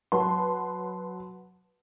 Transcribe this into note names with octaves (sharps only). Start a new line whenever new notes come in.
F#3 B4 A5 C6